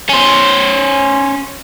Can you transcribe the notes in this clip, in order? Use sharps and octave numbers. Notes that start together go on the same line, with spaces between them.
C#4 C5